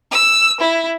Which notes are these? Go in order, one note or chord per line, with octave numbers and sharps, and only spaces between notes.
E6
E4